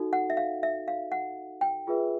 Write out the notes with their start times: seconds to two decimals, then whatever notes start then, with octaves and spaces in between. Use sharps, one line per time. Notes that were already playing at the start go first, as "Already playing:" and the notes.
Already playing: D#4 F#4 A4
0.13 F#5
0.30 E5
0.37 F5
0.63 E5
0.88 F5
1.12 F#5
1.61 G5
1.87 F4 G#4 B4 E5